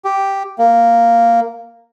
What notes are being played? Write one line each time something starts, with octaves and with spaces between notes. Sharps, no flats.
G4
A#3